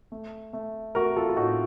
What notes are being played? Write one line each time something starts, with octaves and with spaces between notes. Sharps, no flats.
A3
A3
A3 F#4 A#4
F4 A4
F4
A2 D#4 F#4